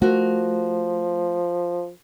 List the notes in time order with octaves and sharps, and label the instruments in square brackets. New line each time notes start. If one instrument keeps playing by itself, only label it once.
[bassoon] F3 [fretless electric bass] A3 [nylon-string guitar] F#4 A#4